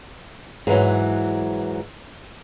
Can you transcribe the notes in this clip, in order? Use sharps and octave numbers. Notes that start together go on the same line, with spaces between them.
G#2 E3 F#3